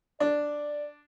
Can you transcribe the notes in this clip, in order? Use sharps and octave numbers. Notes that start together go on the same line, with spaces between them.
D4 D5